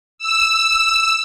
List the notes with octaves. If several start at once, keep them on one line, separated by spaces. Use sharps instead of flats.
E6